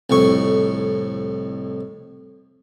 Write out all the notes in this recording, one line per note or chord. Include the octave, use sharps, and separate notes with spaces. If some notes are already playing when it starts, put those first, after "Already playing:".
C2 F2 A2 C#6